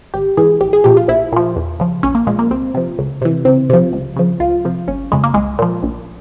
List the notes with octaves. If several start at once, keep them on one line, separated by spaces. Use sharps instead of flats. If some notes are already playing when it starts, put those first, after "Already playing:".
G#1 G4
G#2 E3 G#4
A#1 G4
G#4
A#2 F3 G4
F4
A#1 E4
A#2 F3
E2
C#3 F3
A#1 C#4
A#3
A#2 F3 G#3
A#3
C2 C4
C3 F3
C#2
C3 E3
C#2 C4
C3 F3
C#2
C#3 F3
C#2 F4
C3 F3
G1 C#4
F2 C#3 G#3
A#3
C2 G#3
A#2 F3
A#1